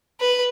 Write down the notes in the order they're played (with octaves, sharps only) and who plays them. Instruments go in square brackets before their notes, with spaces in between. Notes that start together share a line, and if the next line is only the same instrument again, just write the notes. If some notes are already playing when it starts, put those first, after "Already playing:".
[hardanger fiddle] B4